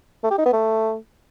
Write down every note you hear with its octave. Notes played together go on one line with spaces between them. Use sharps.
A3
G4
D#4
B3
A3